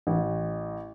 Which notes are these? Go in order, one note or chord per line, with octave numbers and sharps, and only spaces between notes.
A1